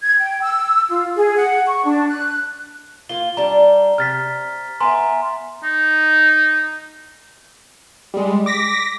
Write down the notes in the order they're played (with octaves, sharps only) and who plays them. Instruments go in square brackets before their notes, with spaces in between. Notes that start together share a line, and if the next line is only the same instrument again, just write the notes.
[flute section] G#6
G5
E6
F4
G#4
F#5
C#6
D4
F#6
[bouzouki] A#3 F4 [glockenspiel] G7
[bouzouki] G3 D4 [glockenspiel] A#5
[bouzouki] C3 [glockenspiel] F6 A6 B6
[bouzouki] B3 B4 E5 [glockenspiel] G#5 A#5 C6
[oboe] D#4
[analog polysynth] G3 G#3
D6 A#6 B6